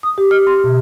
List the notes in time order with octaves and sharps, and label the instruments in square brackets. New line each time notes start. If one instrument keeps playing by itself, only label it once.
[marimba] D#6
G4
F6
C6
B2